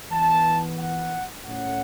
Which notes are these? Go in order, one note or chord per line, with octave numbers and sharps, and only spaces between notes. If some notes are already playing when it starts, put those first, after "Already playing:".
E3 B3 A5
F#5
A2 A3 C#4 F#5